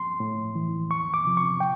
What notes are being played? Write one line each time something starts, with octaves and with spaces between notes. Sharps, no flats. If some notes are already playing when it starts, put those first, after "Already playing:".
Already playing: C6
A2
E3
E2 C#6
D6
C3 F3
C#6
G5